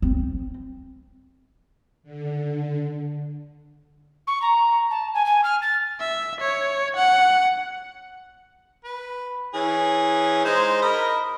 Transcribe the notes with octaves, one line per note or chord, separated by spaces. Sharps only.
C4
D3
C#6
A#5
A5
G#5
G#5
F6
A6
E5
C#5
F#5
B4
E3 C#4 G#4
G#3 D#4 C5
A#4 D#5 B5